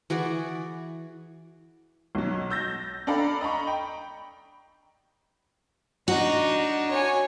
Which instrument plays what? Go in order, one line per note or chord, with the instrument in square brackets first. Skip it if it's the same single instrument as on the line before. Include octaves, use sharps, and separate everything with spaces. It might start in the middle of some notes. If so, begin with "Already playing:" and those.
[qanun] E3 F#4 G#4 D5
[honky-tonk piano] B1 F#3
E6 G6 A6 A#6
D4 A4 D5 F5 A#5 B5
D#5 A#5 B5 C#6
G5
[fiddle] D4 D#4 [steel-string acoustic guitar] F#4
[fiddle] C#5 G#5